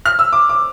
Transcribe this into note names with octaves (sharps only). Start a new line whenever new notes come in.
F6
E6
D6
D6